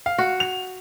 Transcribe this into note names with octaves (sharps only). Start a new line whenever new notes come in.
F5
F#4
F7